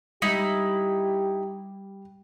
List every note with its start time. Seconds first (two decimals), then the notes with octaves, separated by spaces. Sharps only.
0.22 G3 D#4 E4 G4